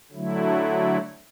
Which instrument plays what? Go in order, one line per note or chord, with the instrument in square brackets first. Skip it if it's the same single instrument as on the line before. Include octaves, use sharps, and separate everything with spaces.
[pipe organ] D3 F#3 A3 E4